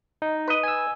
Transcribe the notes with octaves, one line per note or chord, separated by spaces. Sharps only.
D#4
B4 D#5
G#5 E6